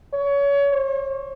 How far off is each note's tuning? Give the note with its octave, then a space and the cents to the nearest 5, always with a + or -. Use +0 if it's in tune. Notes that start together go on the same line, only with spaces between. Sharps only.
C#5 +25
C#5 -45